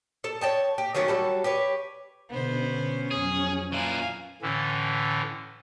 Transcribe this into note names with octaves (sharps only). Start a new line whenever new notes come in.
A4
C#5 D#5 G5 A5
G4
D#3 F#3 A3 C#4
F#3 G3 A4
G4 B4 C#5
B2 D3 B3 C5
C#4
F2 F#3 G#4 C#5
A#2 E3 F5 G#5
A2 D3 E3 C#4